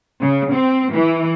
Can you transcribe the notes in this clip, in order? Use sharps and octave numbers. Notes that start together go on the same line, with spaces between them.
C#3
C4
E3